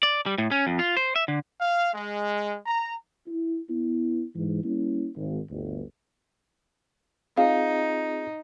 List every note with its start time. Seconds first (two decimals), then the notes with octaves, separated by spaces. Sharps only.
0.03 D5
0.26 G3
0.38 A2
0.51 C#4
0.67 F2
0.79 F4
0.97 C5
1.16 E5
1.28 D3
1.61 F5
1.94 G#3
2.66 A#5
3.27 E4
3.69 B3 E4
4.35 G#2 E3
4.63 G3 A#3 C#4 E4
5.16 G#1
5.50 G1 D2
7.37 C4 D#4 F4 G#4 F5